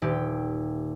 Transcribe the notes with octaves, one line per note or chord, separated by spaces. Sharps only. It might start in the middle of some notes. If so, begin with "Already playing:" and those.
D#1 G4